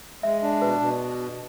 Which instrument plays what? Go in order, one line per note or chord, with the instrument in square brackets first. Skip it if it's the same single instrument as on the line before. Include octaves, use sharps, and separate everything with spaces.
[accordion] G#3 [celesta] E5
[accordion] D4
[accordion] B2 [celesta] B4
[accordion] B2